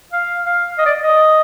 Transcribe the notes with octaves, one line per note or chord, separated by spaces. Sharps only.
F5
F5
D#5
D5
D#5